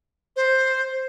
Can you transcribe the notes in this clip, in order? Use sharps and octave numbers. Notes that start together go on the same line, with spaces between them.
C5